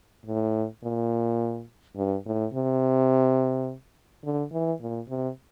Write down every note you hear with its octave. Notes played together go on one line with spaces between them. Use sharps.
A2
A#2
G2
A2
C3
D3
E3
A#2
C3